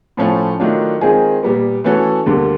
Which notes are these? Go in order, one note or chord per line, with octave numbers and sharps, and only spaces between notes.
A2 F3 A3 C#4 F4
D#3 F#3 A3 D4 F4
D#3 G#3 C4 F4 G#4
A#2 G3 B3
E3 A3 C#4 F#4 A4
D2 D3 G3 A#3